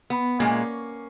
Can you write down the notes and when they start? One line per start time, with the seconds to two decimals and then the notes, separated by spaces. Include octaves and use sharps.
0.10 B3
0.40 A#2 G#3 A#3 C#4